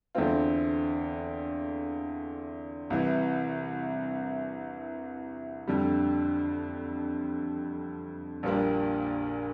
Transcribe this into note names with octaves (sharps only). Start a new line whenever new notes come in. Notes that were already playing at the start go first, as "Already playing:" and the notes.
E2 D3 A3 C4 F4
C2 C3 E3
F2 D3 G3
A#1 A#2 G3 A#3 D4